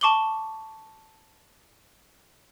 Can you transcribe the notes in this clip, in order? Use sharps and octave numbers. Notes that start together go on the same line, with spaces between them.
A5 C#6 D6 F#7 G7